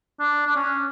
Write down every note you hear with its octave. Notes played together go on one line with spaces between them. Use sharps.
D4
D4
C#4